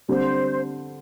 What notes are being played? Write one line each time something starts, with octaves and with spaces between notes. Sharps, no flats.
D3 G3 C4 C5